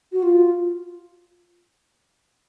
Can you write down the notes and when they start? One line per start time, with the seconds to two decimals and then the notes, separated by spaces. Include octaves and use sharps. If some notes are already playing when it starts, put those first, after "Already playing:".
0.12 F#4
0.23 F4